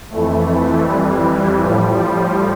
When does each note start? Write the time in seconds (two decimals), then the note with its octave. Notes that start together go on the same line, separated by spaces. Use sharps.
0.10 F2 E3 A3
0.86 G3
1.61 A2 F3 G3